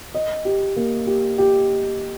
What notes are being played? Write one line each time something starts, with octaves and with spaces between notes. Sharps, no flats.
D#5
G4
A#3
G4
G4